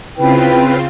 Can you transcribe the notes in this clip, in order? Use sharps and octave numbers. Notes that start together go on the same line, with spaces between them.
C#3 C4 E4 F4 B4 G5